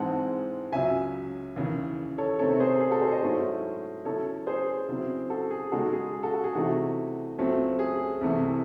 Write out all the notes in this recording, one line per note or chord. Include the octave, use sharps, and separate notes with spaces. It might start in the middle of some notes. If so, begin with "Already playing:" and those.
Already playing: G#2 E3 G#3 C4 F#5 A5
C#2 C#3 F#3 E5 G#5
D#2 C#3 E3
A4 C#5
C3 D#3 A3 C4 A4 C#5
G#4 C5
G#4
F#4 A4
G#4 C5
C5 D#5
G#2 F#3 A3 C#4 E4
C#3 F#3 C#4 E4 A4 C#5
G#4 C5
C#3 F#3 C4 E4
F#4 A4
G#4
C#3 G#3 D#4 F#4 A4
G#4
F#4 A4
F#4
G#4
C3 E3 A3 D#4 F#4
C#2 C#3 F#3 A3 C4
G#4
C2 C3 E3 A3